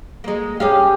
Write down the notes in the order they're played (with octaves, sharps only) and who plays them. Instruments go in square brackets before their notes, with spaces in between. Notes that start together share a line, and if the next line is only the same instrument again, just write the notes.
[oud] G#3 A#3
[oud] C#4 G#4 F5 [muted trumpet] G4